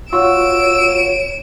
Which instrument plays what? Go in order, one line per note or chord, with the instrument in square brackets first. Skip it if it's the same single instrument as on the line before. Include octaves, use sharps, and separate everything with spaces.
[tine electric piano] F4 F#4 [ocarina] C#5 [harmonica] E6 [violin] D7 E7